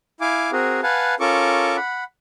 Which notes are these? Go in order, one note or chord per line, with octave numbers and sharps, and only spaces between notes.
E4 F5 G#5 D6
C4 F#4 G#4 A#4
B4 F5 F#5 G#5 A5
C#4 F4 A4 A#4 C#6 D6
F#5 B5